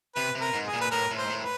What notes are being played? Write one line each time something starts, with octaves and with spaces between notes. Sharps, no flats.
C3 B4
C3
A#4
G#2
G#4
A#2
B4
A2 A#4
A2
C5
G#2
A2
B4